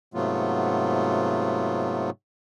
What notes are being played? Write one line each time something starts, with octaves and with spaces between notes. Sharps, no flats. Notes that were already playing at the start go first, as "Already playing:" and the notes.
G#2 C3 F#3 A3 B3 F4